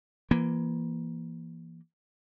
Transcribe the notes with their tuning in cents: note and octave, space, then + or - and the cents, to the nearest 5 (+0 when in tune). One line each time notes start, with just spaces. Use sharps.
E3 +25 A#3 +15